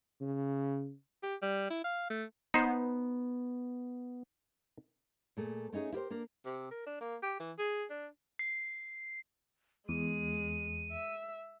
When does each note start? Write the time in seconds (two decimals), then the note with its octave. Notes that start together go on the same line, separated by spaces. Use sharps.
0.21 C#3
1.23 G4
1.42 G3
1.70 E4
1.84 F5
2.10 A3
2.54 B3 D#4 C5
5.37 A#2 A3 G#4
5.73 A3 C#4 D#4 F#4 G#4
5.93 E4 G4 A#4 C5
6.10 A#3 D4 A#4
6.45 C3
6.71 A#4
6.87 D4
7.01 A#3
7.23 G4
7.40 E3
7.59 G#4
7.90 D4
8.39 C7
9.89 E2 G#3 D#7
10.91 E5